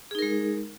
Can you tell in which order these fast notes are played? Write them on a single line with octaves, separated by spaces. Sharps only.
G#4 D#4 A#4 G#3